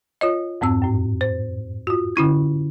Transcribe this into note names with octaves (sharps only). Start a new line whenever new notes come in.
F4 C#5 D#5
F2 G#2 C4 E6
F#2 A2
C5
F4 F#4
D3 C#4 E4 G#6